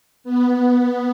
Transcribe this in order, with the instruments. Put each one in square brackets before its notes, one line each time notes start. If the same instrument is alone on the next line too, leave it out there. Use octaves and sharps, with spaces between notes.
[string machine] B3